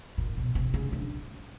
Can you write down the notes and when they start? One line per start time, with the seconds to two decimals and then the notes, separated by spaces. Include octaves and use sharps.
0.18 A#2
0.37 B2
0.55 C3
0.74 C#3
0.92 D3